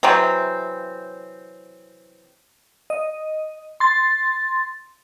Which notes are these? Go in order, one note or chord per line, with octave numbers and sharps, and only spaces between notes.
C3 E3 F#3 C4
D#5
C6 A6